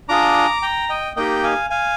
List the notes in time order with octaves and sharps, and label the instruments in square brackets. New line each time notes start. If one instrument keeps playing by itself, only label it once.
[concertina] D4 F4 G#4 A#5 D6
G5 A#5
D#5 G5
A#3 D#4 G4 D#5 G5
F5 G#5
F5 G#5